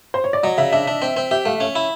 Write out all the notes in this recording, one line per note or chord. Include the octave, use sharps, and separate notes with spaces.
C5
C#5
D5
F#3 D#5
C#3 E5
D4 E5
D4
C4
C4
G4 E5
A3 F5
C#4 E5
E4